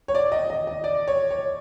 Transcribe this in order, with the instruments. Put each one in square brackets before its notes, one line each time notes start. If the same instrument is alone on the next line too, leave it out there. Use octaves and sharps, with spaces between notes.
[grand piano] C#5
D5
D#5
D#5
D#5
D5
C#5
C#5